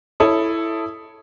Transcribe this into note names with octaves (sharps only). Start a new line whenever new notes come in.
E4 A4 C#5 D#6